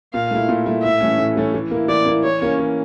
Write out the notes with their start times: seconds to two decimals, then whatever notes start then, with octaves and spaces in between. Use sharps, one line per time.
0.14 A#2 F5
0.31 A3 E4
0.49 A#2
0.66 A3 E4
0.83 A2 E5
1.01 E3 A3 C#4
1.18 A2
1.36 E3 A3 C#4
1.54 E3
1.71 A#3 E4
1.88 E3 D5
2.06 A#3 E4
2.23 E3 C#5
2.42 A#3 C#4
2.59 E3